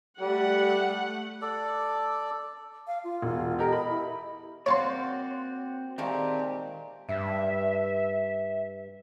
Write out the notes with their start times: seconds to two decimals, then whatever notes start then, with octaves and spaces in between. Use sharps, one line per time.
0.20 G3 A3 F#5
1.42 A4 D5
2.87 F5
3.04 F4
3.22 E1
3.59 G4 A4 A#4 D#5
3.73 B5
3.89 E4
4.66 A#3 C4 F#4 C#5 D5 A5 C6
5.98 A#2 D#3 G#3 A3 C4 G4
7.09 G2 E5